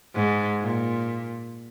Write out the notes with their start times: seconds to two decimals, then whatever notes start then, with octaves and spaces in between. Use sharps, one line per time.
0.14 G#2
0.61 A#2